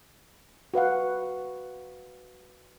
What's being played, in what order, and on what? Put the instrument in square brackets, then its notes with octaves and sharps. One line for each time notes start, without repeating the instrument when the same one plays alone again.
[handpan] F#4 B4 F5 F#5